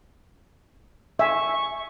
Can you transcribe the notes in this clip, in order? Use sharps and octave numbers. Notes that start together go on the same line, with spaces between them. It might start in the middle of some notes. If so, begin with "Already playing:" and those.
E5 G#5 C#6